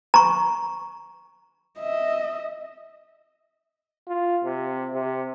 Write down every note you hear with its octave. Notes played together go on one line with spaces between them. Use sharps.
A#5 C#6
D#5 E5
F4
C3
C3